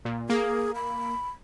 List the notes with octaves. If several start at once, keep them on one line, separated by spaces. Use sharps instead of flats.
A#2
A#3 G#4
B5